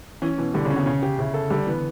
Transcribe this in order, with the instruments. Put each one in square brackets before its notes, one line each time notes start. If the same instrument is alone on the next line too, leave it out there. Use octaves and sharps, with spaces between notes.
[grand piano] E3 [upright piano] C#4
[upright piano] B2 [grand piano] E3
[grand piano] D3 [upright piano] G3
[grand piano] C#3
[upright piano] C#4
[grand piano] B2
[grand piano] C#3 [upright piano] C#4
[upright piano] G4
[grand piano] C#3 [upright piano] E4
[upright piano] A4
[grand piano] D3 [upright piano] G3
[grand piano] E3 [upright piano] B3